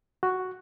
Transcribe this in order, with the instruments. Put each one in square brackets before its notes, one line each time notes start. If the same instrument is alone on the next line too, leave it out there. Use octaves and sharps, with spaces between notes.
[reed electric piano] F#4